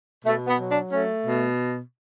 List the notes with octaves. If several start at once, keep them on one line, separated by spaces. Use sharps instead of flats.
B2 A3
B3
F#3
D4
A3 C#4
B2